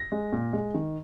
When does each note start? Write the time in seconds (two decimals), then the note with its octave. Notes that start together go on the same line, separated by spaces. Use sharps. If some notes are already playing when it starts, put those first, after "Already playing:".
Already playing: A#6
0.12 G#3
0.33 A#2
0.53 G#3
0.74 D#3